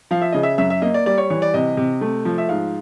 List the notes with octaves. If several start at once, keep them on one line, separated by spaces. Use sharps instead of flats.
F3 F5
E5
C#3 D#5
E5
F#2 E5
E5
A#3 D#5
D5
G3 D5
C#5
E3 C#5
D5
C3 D#5
C3
A3
F3
E5
G#2 F5